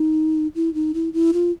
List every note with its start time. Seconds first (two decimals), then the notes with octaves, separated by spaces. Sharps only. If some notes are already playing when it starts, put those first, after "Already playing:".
Already playing: D#4
0.55 E4
0.74 D#4
0.94 E4
1.13 E4
1.33 F4